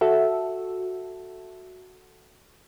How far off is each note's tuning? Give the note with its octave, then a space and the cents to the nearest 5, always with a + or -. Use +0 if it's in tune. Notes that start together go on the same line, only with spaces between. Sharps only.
F#4 +0 A4 +0 E5 +0